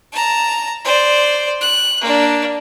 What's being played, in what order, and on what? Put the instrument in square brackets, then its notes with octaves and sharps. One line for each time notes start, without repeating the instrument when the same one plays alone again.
[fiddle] A5 A#5
C5 D5
F#6
A#3 D4